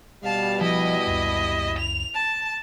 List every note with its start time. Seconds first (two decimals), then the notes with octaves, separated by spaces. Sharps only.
0.24 B2 G3 F5 A5
0.61 F3 E4 D#5
1.07 C#2 F#2
1.78 F7
2.14 A5